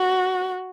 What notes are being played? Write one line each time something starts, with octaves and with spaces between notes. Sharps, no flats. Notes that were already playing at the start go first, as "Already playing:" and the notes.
Already playing: F#4